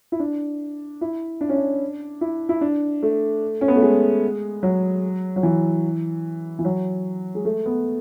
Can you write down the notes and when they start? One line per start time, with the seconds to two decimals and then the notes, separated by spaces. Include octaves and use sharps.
0.12 E4
0.20 D4
1.01 E4
1.41 D4
1.49 C#4
1.56 D4
2.21 E4
2.49 E4
2.61 D4
3.03 A3
3.61 C#4
3.68 B3
3.76 A3
3.82 G#3
4.63 F#3
5.36 F#3
5.43 E3
6.59 E3
6.65 F#3
7.35 G#3
7.45 A3
7.66 B3